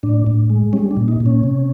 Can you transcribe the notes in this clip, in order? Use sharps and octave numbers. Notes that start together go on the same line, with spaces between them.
A2 D4
A2
G#3
G3 C#4
D4
A#2
D#4
A#2
C#4
C3